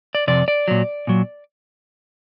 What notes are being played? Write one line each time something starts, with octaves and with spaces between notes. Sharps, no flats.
D5
F2 C3 D5
D5
A#2 F#3
A#2 F#3